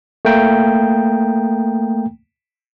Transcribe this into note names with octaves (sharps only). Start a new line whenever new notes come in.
A3 A#3 G5 A#5